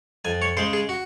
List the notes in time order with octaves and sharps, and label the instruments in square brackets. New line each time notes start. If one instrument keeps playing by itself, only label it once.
[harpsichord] F2 G#5
C#5
C#3 G#3 C5
G#4
F#4